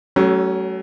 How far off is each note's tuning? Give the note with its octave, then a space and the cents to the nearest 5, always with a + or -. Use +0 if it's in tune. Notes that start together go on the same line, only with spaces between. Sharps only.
F#3 +35 A3 -10 C#4 +0